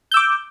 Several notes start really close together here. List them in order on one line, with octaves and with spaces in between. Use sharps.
G6 E6 D6